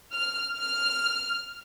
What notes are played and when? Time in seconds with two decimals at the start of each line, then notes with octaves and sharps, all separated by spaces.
0.12 F6
0.57 F6